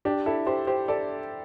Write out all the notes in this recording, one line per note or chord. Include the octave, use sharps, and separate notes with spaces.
D4 G4
E4 A4
G4 C5
G4 C5
A4 D5